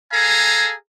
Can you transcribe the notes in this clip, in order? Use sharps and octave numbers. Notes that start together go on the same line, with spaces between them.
G#4 A4 F5 G#5 A#5